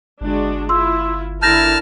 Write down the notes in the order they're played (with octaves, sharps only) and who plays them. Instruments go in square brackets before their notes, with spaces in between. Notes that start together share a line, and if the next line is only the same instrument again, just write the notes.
[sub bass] G1 [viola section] G#3 D4 F#4
[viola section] E4 F4 [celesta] C6 E6
[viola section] D3 E4 A#4 [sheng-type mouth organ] A5 F6 [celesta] G6 A#6